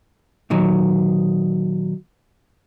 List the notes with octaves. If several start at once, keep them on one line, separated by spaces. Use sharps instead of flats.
A#2 D#3 F#3